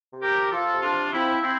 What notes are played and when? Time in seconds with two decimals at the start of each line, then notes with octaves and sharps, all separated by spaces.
0.12 C3
0.22 G4 A#4
0.33 F3
0.52 F3 F4 A4
0.72 C3
0.82 D4 F4
0.93 F3
1.12 F3 C4 E4
1.32 F3
1.42 C4 E4